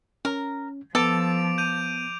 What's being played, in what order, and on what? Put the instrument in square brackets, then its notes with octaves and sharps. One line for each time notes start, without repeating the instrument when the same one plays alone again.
[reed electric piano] C#4 [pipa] A#4
[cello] F3 [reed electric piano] B3 [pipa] A4 [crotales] D6 D7 F7
[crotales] G6 D#7 F7